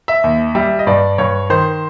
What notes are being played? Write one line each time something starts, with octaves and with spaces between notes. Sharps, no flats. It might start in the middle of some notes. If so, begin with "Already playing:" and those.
E5
D#2
G3 E5
D#5
G2 D5
G2 C#5
D#3 C5